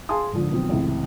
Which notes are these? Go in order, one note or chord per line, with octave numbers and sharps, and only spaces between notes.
G#4 F5 G#5 A5 C6 D#6
G#2 D3 F3
B2 D#3 F3 F#3 C4
C#2 A2 C3 E3 C4